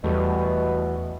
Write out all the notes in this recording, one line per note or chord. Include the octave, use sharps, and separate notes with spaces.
E2 B2 G3 A3